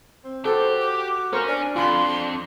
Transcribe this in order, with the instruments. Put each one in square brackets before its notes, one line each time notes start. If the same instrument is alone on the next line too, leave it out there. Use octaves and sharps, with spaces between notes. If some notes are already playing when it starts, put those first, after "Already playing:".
[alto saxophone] C4
[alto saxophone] F#4 [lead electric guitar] G4 [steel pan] A4 [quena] C5
[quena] D6
[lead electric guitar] C#4 [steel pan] A#4 C5 C#6
[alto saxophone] D4 [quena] G#5
[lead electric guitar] F2 [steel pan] F4 B5 [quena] C6